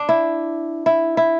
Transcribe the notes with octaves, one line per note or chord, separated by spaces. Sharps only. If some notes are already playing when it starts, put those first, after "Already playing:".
Already playing: D4
E4
E4
E4